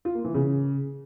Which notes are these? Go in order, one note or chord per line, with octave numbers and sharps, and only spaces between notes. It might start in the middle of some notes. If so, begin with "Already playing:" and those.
F4
A#3
E3
C#3